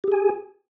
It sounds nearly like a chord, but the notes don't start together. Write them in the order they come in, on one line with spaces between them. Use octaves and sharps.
G4 G#4 G#5